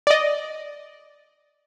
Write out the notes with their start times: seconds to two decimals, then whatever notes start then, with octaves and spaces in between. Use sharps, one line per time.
0.07 D5 D#5